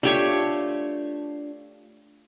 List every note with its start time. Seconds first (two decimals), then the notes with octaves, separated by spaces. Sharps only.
0.03 A3 D4 F4 G4 C#5